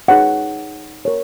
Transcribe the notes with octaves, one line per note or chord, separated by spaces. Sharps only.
D#4 G#4 C#5 F#5
A#4 C#5